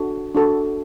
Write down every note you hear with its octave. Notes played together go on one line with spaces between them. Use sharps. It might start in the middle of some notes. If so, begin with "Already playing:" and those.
Already playing: D4 F#4 A4
D4 F#4 A4